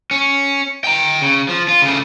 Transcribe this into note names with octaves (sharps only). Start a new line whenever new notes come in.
C#4
G5 A#5
C#3
F3
F4
C#3 A3